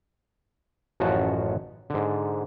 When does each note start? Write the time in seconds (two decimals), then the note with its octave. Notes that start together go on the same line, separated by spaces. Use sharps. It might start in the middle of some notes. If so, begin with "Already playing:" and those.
1.00 A1 F#2 F3 F#4 F#5 A5
1.90 G#2 D3